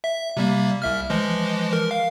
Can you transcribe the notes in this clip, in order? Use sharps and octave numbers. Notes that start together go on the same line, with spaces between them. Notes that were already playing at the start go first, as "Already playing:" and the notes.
E5
C3 G3 A#3
C2 E5 F6
E3 F3 G#3
A#4
F5